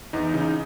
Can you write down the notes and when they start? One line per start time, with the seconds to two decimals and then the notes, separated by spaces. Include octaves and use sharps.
0.13 E2 D#4
0.34 C#3 D#4